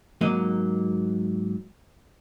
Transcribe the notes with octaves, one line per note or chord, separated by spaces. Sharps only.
G#2 F#3 A#3 D#5